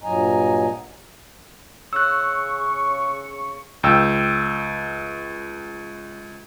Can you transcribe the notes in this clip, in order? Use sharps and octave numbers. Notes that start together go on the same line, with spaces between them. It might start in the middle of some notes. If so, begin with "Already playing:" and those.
G2 A#2 F#3 D#5 G#5 A#5
C#3 C#6 E6 F#6
C#2 G5 E6